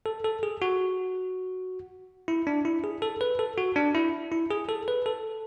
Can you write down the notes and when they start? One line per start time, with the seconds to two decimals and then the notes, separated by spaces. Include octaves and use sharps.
0.06 A4
0.25 A4
0.43 G#4
0.62 F#4
2.28 E4
2.47 D4
2.65 E4
2.84 G#4
3.02 A4
3.21 B4
3.39 A4
3.58 F#4
3.76 D4
3.95 E4
4.32 E4
4.51 G#4
4.69 A4
4.88 B4
5.06 A4